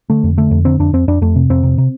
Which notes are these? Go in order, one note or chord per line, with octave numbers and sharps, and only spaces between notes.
D3 A3
F2
D3 A3
F2
D3 C4
F2 D4
F2 C4
F2 D4
F2 A3
C3
F2 C4
C3
C3